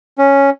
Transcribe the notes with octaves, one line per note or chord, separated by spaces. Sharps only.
C#4